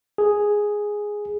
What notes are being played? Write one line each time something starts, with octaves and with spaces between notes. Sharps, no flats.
G#4